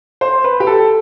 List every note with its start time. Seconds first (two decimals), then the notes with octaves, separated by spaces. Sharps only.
0.21 C5
0.44 B4
0.60 G4
0.67 A4